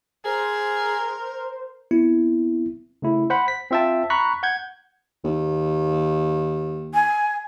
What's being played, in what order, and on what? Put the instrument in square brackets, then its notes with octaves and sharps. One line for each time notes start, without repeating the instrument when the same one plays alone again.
[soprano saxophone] G#4 [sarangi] A#4 [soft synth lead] C5
[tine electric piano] B3 C4 E4
C#3 A3 E4
C5 F#5 B5
B6
C4 F4 E5 G5 A5
A#5 B5 C#6 F#6 B6
F#5 G6 G#6
[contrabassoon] D#2
[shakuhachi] G#5